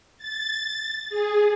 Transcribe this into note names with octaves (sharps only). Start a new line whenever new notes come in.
A6
G#4